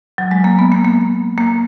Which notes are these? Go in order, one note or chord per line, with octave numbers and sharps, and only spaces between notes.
F#3
G#3
A#3
B3
A#3
A#3
A#3